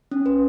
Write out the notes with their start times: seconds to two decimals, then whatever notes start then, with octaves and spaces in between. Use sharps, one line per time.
0.11 C#4
0.26 B4